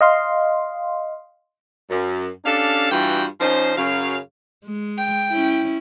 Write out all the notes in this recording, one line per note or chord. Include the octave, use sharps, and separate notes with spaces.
D#5 F5 C6
F#2
C#4 D4 G4 A4 F5
G2 E3 G3 F4 F#4 G5
F3 C#4 D#4 C5
F#2 C#3 F#3 F5
G#3
G5
C#4 E4